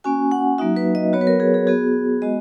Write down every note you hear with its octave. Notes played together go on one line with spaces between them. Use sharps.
A#3 C#4 F#4 G#5
F#5
F#3 A#3 D#4 F#4 E5
B4
D#5
F#3 B3 F#4 C#5
B4
A#4
G#4
G#4
B3 F#4 G#4
G#3 B3 F#4 D#5